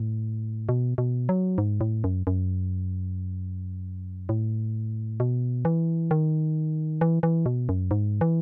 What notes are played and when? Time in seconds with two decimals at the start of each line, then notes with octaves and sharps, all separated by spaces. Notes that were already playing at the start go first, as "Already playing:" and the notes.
Already playing: A2
0.69 B2
0.98 B2
1.29 F#3
1.58 G#2
1.81 A2
2.04 F#2
2.27 F#2
4.29 A2
5.20 B2
5.65 E3
6.11 D#3
7.01 E3
7.23 E3
7.46 B2
7.69 F#2
7.91 G#2
8.21 E3